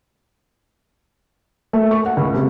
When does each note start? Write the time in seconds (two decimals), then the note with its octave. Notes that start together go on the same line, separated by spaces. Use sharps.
1.73 A3
1.91 C#6
2.06 F#5
2.17 C#2
2.34 C3